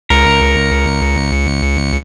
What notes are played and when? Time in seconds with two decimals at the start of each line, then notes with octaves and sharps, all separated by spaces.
0.10 C#2 A#4 C#7